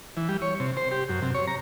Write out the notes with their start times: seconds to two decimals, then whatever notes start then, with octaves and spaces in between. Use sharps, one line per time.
0.17 E3
0.29 G3
0.42 C#5
0.60 C3
0.77 C5
0.91 G4
1.09 F#2
1.22 C3
1.35 C#5
1.47 A#5